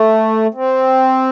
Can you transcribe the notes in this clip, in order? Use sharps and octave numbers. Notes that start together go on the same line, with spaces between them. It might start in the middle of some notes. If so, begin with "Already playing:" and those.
Already playing: A3
C4